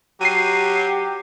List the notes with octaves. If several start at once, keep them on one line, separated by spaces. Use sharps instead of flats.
F#3 G4 C7 D#7